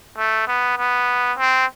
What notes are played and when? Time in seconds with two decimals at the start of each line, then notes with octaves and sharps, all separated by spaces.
0.18 A3
0.48 B3
0.78 B3
1.38 C4